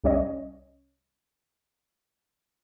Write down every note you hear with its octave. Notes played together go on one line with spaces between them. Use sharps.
C2 G3 C#4 C#5 D#5